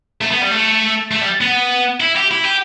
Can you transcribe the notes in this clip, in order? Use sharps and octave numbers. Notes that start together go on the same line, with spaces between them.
A3
B3
G3
A3
A3
G3
B3
E4
G4
E4
G4